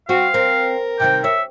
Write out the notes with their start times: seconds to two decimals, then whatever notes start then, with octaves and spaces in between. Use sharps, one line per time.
0.09 C4 F#4 F5
0.34 C4 A#4
1.00 C3 D#3 C4 G5
1.24 C#5 E5